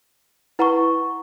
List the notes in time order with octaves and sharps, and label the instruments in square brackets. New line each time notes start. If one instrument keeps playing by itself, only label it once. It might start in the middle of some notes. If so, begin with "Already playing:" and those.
[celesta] E4 B4 F#5 A#5 C#6